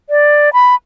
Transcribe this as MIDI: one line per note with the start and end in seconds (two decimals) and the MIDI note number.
0.10 0.50 74
0.53 0.75 83